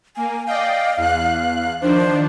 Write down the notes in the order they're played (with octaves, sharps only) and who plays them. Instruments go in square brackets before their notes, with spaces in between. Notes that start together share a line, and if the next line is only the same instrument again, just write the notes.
[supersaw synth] A#3 [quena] G#5
[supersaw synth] D5 D#5 G5 [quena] F5
[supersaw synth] E2 F#6
[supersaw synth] D#3 F3 D4 [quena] C5